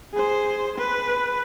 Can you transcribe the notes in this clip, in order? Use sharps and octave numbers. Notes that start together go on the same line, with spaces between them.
G#4 C5
B4